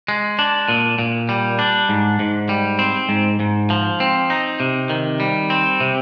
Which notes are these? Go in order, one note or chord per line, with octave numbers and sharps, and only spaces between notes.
G#3
D4
A#2
A#2
G3
D4
G#2
G#2
G3
C4
G#2
G#2
F3
C4
D#4
C3
D#3
G3
C4
C3